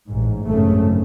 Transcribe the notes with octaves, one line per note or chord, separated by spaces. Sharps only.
A1 G#2
G#1 F#2 C#3 A3